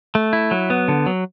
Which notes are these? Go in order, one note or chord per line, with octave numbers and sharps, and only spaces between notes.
A3
E4
F#3
B3
D3
F#3